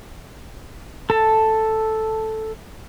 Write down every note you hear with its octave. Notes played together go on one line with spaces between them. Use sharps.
A4 A5